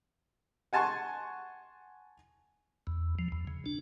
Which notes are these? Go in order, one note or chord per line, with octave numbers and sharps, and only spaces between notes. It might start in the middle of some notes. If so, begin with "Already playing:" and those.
F#5 G#5 A5 C6 C#6
E2
F3
E2
C#3
D4